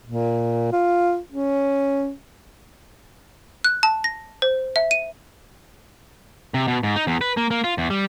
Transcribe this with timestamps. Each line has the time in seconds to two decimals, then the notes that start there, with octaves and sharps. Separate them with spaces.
0.05 A#2
0.72 F4
1.32 C#4
3.64 F#6
3.83 A5
4.04 A#6
4.42 C5
4.76 E5
4.91 D#7
6.54 C3
6.68 B2
6.83 G#2
6.96 D#4
7.07 E2
7.21 B4
7.37 A#3
7.51 A#3
7.64 F4
7.78 E2
7.90 G3